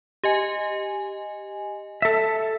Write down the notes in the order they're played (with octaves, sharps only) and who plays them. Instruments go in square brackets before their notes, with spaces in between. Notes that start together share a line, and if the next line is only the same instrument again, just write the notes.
[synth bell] G4 D#5 G#5
[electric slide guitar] A4 E5